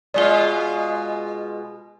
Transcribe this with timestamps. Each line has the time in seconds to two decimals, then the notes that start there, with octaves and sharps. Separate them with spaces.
0.14 B2 G#3 F4 D5 G7